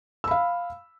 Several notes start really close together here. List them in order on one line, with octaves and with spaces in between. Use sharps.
E6 B5 F5